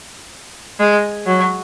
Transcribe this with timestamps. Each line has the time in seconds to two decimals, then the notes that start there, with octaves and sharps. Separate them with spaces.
0.80 G#3
1.27 F#3